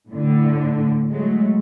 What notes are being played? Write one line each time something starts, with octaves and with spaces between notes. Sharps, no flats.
A2 D3
F#3 G#3 A3